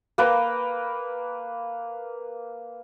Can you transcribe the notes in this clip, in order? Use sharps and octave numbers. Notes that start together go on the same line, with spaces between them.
A#3 B4 G5 A#5